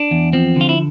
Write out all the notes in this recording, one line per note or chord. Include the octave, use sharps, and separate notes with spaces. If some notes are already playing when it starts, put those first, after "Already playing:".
Already playing: D4
E2
F3 C4
D3 F4
E4